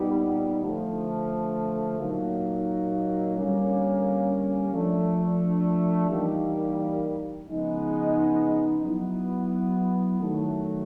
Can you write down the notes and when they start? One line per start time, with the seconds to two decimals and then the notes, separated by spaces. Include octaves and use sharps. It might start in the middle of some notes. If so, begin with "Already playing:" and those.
Already playing: A#2 G3 B3 D#4
0.62 D3 F3 A3
1.98 A#2 F#3 A#3 D#4
3.35 D3 G3 A#3 C#4
4.72 F3 A3 D4
6.09 E3 G3 A#3 D#4
7.46 C#3 F3 G#3 B3 D#4
8.82 F#3 B3 E4
10.20 D#3 F#3 A3